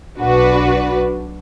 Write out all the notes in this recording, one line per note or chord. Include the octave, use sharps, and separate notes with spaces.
B1 D4 F#4 B4